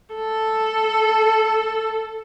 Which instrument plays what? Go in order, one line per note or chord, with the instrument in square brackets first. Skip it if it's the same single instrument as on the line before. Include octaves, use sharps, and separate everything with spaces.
[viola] A4